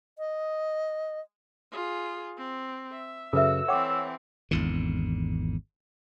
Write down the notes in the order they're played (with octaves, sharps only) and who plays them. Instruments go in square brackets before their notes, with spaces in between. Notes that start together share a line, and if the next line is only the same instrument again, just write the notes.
[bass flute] D#5
[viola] F4 G#4
C4
E5
[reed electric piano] F#2 C#3 [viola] F#4 [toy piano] A4 B4 E5 [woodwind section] E6
[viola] E3 C4 [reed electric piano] C#5 [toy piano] F#5 G5 D6
[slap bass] G#1 E2 D3